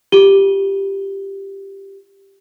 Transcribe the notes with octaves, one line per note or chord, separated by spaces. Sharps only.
F4 G4 D#7 G7